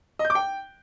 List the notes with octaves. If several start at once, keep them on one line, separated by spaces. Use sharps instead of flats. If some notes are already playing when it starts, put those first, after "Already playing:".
D#5
G6
D6
G5